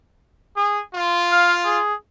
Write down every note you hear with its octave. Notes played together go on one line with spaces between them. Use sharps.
G#4
F4
F5
G#4